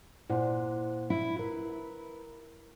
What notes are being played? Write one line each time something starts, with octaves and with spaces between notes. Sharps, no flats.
A#2 E4 C5 F#5
E4
A#4 B4